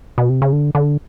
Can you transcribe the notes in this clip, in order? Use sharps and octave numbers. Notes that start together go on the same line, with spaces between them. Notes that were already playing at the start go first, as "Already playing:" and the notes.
B2
C3
C#3
D3
D3